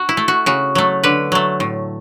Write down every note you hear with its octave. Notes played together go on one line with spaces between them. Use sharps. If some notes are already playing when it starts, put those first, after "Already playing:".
Already playing: F#4
E4
A3
F#4
C#3 F#4
F#3 A3
D3 B4
F#3 A3
A2